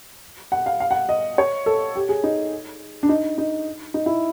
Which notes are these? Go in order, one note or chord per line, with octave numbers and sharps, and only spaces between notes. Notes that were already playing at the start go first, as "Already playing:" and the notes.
F#5
F5
F5
F#5
D#5
C#5
A4
G4
G#4
D#4
D4
D#4
D#4
D#4
E4